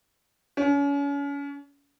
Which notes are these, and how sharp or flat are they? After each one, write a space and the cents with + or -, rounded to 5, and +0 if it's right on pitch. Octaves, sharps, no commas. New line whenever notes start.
C#4 +35